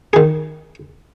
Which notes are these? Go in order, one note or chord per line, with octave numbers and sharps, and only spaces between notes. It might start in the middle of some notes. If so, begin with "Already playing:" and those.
D#3 G#4